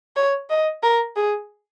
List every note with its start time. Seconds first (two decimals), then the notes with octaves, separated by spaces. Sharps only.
0.16 C#5
0.50 D#5
0.83 A#4
1.16 G#4